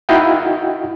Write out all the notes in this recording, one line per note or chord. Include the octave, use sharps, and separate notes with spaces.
D#4 E4 F#4 D#5 F5 G5